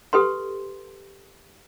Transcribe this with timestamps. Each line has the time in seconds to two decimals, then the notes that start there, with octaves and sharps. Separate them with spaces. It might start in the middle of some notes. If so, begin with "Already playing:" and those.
0.13 G4 A4 B4 C6